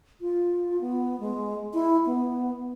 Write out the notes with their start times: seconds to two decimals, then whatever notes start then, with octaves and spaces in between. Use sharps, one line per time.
0.21 F4
0.81 B3
1.20 G#3
1.74 E4
2.06 B3